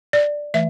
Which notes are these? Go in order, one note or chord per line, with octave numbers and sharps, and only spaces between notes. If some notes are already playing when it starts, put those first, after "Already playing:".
D5
E3 A3 E5